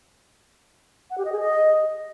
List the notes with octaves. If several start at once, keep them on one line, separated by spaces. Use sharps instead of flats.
F#5
G4
D#5
G#4
D#5